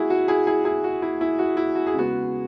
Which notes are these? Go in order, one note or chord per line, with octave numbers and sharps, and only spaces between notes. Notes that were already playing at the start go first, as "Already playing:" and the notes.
Already playing: G#3 E4 F#4 G#4
F#4
E4 G#4
E4 G#4
E4 G#4
F#4
E4
E4
F#4
E4
F#4
G#4
C#3 G#3 B3 F#4